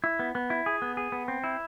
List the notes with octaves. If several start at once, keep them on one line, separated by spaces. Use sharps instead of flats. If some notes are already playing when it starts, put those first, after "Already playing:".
E4
B3
B3
E4
G#4
B3
G#4
B3
C4
E4